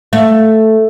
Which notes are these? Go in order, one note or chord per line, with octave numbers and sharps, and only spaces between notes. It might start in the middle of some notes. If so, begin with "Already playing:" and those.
A3